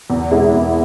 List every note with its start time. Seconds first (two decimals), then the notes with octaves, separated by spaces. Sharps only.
0.10 E2
0.31 B2 G#3 E4
0.53 E2